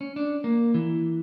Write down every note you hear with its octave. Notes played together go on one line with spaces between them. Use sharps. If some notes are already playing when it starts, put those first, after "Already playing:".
C#4
D4
A#3
E3